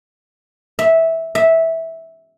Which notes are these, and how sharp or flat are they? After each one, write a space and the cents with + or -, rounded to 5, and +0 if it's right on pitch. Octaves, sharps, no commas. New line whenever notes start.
E5 -10
E5 -10